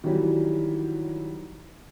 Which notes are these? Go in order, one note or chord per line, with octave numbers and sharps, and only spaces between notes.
D#3 E3 F#3 G3